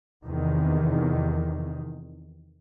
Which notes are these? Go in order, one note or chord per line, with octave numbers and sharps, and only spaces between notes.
E2 C3 D#3